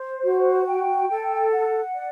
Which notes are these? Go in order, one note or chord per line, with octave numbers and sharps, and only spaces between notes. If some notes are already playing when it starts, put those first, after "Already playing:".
Already playing: C5
F#4
G5
A4
F#5
D5